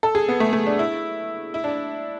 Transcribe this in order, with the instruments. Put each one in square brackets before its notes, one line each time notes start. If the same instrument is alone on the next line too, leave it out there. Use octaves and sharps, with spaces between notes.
[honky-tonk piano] A4
G#4
B3
A3
A3
D4
E4
E4
D4